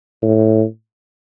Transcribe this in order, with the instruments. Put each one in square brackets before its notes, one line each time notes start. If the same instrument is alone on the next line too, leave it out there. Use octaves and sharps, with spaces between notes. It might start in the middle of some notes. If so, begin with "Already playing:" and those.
[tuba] A2